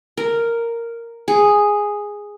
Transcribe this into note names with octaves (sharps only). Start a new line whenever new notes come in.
A#4
G#4